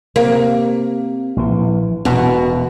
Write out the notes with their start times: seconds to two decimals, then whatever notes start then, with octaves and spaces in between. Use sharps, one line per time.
0.16 C3 A#3
1.36 A#1 E3
2.05 E1 B2 B3